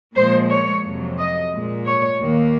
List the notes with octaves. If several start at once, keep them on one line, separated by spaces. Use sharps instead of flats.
A#2 F3 G#3 C5
C#5
F2 C3 F#3
D#5
A#2 G#3
C#5
D#2 D#3 A#3